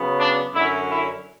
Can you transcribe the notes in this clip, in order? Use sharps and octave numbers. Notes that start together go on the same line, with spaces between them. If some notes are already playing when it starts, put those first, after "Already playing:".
Already playing: C#3 F#3 B3
D4
F#2 D3 F#3 C#4 E4
E4